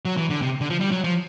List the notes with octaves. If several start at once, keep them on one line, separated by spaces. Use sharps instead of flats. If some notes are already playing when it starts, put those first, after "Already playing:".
F#3
E3
D3
C3
D3
F3
G3
F#3
F3